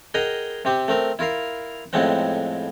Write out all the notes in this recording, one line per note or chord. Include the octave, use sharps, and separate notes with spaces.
G#4 A#4 D#5 F#5 G5
C3 C4 G4
A3 C4 A#4
E4 F4 A#4 F5
F2 A2 G#3 B3 C4 F#5